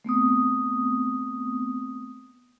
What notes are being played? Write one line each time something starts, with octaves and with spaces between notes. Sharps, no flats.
A3 B3 C4 D#6